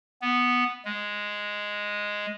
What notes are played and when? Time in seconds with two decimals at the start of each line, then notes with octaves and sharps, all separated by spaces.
0.22 B3
0.85 G#3